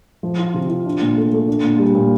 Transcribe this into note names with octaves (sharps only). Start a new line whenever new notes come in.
F3
F4
C3
F4
D4
A#2
A3
A3
D4
A#2
G3
A#2